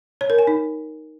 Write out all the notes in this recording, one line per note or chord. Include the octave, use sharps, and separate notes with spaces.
C#5
A#4
G#5
D#4